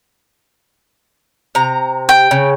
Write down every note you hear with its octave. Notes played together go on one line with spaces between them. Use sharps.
C3 A#5
G5
C#3